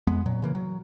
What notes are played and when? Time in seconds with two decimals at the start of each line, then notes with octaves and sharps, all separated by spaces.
0.07 F2 G#3 B3
0.26 A#2 F#3
0.42 C#3 E3 A#3
0.55 F#3